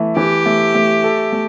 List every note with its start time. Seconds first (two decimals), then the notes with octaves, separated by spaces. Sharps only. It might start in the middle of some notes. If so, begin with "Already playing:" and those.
Already playing: E3 A3
0.17 E3 G4
0.46 A3
0.75 A3
1.04 A4
1.32 A3